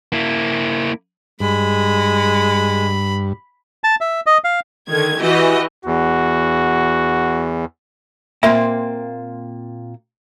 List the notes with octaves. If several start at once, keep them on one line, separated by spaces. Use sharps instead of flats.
A#3 E4
G2 G#3 B5
A5
E5
D#5
F5
D3 D#3 G#6
E3 F#4 G4 D#5
E2 F#4
A#2 A#3 C4 E5